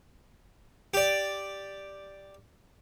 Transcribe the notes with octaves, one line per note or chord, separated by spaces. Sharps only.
G4 D5